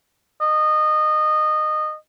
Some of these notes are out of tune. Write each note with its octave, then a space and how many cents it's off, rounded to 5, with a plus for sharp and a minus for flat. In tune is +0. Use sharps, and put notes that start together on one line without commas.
D#5 -20